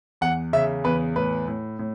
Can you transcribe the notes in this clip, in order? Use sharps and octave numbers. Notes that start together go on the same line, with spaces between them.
E2 F#5
C#3 E5
E2 B4
A2 B4
A2
A2